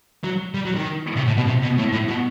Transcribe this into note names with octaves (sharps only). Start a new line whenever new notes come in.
F#3
G3
F#3
D#3
C3
A2
B2
C3
B2
A2
A2
B2